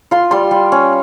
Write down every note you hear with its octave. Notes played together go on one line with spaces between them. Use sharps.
F4 C6
G3 C6
G3
C#4